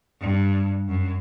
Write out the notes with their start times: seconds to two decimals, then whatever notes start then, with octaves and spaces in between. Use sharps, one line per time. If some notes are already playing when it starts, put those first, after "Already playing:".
0.21 G2
0.88 F#2